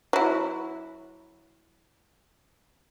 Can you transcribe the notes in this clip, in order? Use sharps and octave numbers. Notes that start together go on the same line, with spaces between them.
F#3 E4